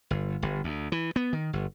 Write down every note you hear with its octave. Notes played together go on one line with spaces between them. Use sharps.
G1
G1
D2
E3
B3
D#3
G1